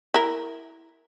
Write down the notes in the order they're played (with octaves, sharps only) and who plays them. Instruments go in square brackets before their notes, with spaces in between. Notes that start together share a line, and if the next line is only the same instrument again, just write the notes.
[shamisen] E4 A#4